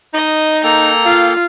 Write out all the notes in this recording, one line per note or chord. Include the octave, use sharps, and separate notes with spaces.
D#4 D#5
A#3 A4 G5 A#5
F4 F5